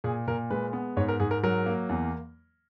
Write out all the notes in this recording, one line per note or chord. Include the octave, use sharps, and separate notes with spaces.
A#2 G#4
A#2 A#4
G#3 B4
B3
G#2 C#5
A#4
G#2 G#4
A#4
F#3 A#4
A#3
E2